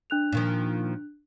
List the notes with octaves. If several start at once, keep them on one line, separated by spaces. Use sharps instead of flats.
D4 F#6 F7
A#2 D#3 F3